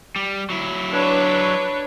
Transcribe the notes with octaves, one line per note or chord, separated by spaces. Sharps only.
G3
F#3 E4
D4 B4 C#5